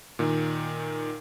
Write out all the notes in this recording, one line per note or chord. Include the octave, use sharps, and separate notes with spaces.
A#2 D#3